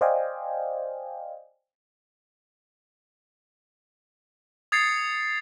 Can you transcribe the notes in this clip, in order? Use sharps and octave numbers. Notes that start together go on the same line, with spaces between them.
C5 D5 D#5 F5 G5 G#5
D#6 G#6 A6 C7 C#7